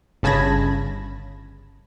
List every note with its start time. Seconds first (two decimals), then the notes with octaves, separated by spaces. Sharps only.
0.23 G1 C#3 A5 B5 G#6 A#6